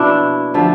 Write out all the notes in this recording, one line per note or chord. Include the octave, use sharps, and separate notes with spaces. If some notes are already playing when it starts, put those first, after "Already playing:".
Already playing: B2 A#3 D4 E4 F#4
D3 F3 A3